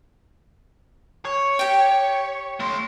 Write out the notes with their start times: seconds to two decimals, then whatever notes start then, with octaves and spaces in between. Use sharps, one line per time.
1.25 C#5
1.59 G4 G5
2.60 A3 C6